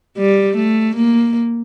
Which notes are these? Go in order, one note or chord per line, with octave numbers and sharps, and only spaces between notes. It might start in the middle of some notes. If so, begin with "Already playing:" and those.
G3
A3
A#3